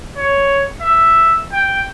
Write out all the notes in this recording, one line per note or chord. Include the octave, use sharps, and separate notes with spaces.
C#5
E5
G5